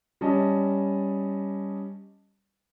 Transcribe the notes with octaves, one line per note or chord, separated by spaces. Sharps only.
G3 C#4 D#5 A5